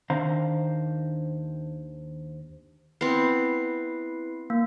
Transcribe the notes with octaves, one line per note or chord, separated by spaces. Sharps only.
D#2 D#3 D4 C5 F5 A#5
B3 C4 E4 B4 C7
A#3